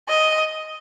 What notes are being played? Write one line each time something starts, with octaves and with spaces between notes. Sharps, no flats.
D#5